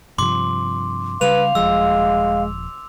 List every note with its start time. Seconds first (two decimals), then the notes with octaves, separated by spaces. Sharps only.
0.18 G2 C3 F3 C6 D6
1.21 C#3 G3 B4 F5 F7
1.55 D#1 F3 G#3 E6